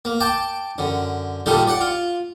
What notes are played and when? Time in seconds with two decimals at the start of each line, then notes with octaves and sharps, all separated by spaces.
0.05 A#3
0.20 G5 A5 D6
0.78 F#2 D3
1.46 A#2 D3 D#3 G3 A4
1.67 D5 F#5
1.81 F4